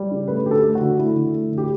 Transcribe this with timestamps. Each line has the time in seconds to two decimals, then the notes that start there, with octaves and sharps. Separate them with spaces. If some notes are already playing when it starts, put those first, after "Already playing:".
Already playing: G3
0.11 C#3
0.28 A3 B4
0.45 D3 G4
0.51 A4
0.63 A3
0.75 F#4
0.81 D3
0.98 A3 E4
1.16 D3
1.33 A3
1.51 D3
1.58 G4